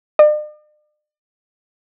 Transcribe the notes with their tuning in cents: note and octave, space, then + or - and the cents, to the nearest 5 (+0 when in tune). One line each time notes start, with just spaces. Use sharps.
D5 +45